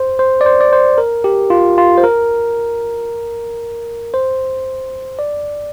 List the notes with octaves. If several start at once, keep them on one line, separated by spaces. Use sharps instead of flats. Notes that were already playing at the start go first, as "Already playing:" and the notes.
Already playing: C5
C5
D5
C5
D5
C5
A#4
G4
F4
F4
C5
A#4
C5
D5